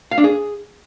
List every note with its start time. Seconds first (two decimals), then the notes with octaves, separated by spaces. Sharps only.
0.11 F5
0.18 D4
0.24 G#4